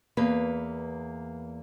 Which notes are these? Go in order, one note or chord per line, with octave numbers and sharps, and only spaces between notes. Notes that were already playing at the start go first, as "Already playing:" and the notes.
E2 A#3 B4